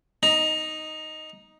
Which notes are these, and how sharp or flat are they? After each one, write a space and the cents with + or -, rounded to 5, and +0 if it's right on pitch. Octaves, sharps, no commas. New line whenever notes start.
D#4 +0 A#5 +20